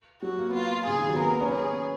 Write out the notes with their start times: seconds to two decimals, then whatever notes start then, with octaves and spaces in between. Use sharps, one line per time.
0.22 F#3 F#4
0.39 A#3
0.49 B3
0.54 A#3 F4
0.86 C#3 G#4
0.98 D#3
1.09 F#3
1.14 B3
1.19 A#3 A#4
1.30 B3
1.41 C#4
1.52 B3 G#4